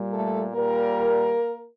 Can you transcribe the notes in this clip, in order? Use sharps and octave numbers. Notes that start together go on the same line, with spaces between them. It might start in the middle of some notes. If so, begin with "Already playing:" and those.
Already playing: A#2 G3
A3 A4
A#2 G3 A#3 A#4